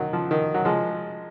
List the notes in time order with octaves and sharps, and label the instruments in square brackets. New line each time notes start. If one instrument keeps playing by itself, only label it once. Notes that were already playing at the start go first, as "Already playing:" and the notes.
Already playing: [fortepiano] D#3 F#3
F3
D#3
F#3
F3 G#3